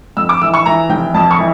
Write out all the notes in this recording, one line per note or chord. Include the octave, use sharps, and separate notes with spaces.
F2 E6
D6
E3 E6
C#6
E3 A#5
F1 G5
F2 A5
C#6
E3